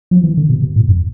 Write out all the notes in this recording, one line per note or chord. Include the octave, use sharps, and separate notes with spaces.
F3
E3
D3
B2
B2
A2
F2